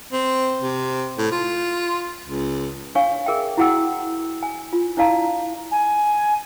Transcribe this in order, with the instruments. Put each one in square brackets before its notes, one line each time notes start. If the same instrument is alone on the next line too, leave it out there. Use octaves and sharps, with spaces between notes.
[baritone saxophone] C4
C3
A2
F4
C#2
[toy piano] D4 C#5 F5 G#5 C#6
G#4 A#4 E5 G5
E4 F#4 G#4 F#5 G5 E6
G#5
F4
D4 E4 D5 F5 A5 A#5
[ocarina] G#5